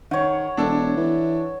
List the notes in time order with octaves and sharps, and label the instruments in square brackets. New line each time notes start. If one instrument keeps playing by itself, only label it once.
[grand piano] D#3 [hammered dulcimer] C#5 F#5
[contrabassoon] E1 [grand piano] D4 A4
[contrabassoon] E3